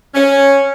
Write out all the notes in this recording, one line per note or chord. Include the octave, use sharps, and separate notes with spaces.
C#4